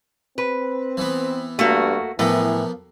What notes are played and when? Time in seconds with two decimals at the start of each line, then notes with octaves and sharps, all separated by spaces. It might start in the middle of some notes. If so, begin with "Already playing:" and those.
0.38 C4 B4
0.97 E3 B3
1.59 G2 A3 A#3 F#4
2.19 A2 E3 F3 A#3 B3